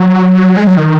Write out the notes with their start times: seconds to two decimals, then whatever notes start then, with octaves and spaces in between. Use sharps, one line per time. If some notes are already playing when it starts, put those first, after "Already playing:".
Already playing: F#3
0.57 G#3
0.67 F#3
0.77 D#3